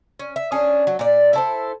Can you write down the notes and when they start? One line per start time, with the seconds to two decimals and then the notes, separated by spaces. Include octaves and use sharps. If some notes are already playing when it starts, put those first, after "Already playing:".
0.19 C#4
0.36 E5
0.52 C#4 D4 G#4
0.87 F#3
0.99 A#2 D5
1.33 E4 A4 C5